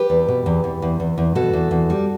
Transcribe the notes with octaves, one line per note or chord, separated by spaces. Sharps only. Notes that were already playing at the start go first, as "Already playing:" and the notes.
Already playing: G4 B4
E2
B2
E2
E2
E2
E2
E2
B2 F#4 A4
E2
E2
G3